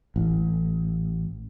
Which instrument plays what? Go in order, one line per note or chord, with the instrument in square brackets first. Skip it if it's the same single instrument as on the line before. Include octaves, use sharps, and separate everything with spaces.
[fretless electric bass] A1